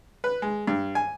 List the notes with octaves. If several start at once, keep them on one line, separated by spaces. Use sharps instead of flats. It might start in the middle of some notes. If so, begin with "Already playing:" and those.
B4
G#3
G2
G#5